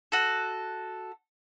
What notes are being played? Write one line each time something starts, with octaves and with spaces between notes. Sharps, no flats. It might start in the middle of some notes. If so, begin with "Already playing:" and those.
F#4 A4